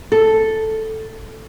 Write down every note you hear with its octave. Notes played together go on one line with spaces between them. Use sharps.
A4